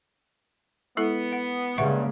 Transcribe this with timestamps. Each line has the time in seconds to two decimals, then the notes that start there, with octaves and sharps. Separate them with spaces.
0.97 G#3 B3 E4 A4
1.32 F#5
1.78 G2 C#3 G#3 A#3 E5 F#5 C#6